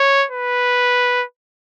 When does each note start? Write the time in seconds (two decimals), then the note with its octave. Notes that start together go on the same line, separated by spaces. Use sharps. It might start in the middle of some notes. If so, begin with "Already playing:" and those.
Already playing: C#5
0.31 B4